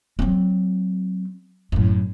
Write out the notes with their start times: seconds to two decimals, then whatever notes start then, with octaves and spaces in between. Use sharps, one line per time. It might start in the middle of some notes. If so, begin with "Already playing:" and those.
0.19 F#3 C4
1.72 F#2 A2